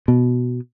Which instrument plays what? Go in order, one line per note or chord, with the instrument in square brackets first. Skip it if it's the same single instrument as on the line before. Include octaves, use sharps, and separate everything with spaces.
[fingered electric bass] B2